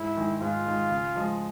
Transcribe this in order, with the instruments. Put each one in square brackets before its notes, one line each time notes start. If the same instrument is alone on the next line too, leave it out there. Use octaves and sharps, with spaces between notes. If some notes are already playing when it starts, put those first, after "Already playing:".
Already playing: [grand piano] G#2 [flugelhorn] E4
[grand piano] D#3 G#3
[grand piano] G#2 [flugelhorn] F4
[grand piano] D#3 G#3
C#3
F3 G#3